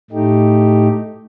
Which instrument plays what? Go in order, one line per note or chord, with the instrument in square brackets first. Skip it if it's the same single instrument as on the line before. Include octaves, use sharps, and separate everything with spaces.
[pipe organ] A2 A3 D#4 G4